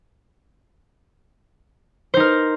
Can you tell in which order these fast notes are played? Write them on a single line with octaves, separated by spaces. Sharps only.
C5 D#4 A#4